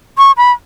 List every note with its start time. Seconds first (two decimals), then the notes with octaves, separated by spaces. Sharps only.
0.18 C#6
0.37 B5